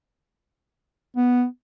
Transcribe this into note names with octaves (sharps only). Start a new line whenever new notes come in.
B3